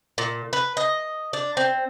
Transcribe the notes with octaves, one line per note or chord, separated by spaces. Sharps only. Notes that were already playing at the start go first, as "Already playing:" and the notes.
A#2
B4
D#5
D4
C4